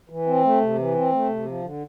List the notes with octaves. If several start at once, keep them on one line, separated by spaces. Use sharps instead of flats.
E3
C4
A3
C3
E3
C4
A3
C3
F3
D3